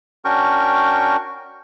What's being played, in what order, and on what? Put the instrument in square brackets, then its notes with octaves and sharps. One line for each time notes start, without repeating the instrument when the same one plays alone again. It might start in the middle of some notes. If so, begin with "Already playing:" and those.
[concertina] C#4 D4 F#4 A#4 G5 C#6